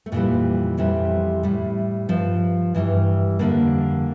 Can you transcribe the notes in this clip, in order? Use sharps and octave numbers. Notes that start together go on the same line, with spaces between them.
A3
F2 A#2 E3 G3 A#3
F2 C3 E3 G3
A2 G3
G2 F3
G2 E3 G3
F2 A#2 D3 G3 A#3